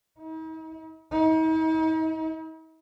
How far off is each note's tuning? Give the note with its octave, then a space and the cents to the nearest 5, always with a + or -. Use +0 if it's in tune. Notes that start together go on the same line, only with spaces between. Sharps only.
D#4 +45
D#4 +45